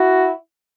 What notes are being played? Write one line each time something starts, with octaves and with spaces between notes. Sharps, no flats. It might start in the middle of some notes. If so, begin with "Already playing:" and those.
Already playing: E4 F#4